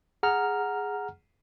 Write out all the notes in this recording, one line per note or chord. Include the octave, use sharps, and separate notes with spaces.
G#4 F#5 A#5 F6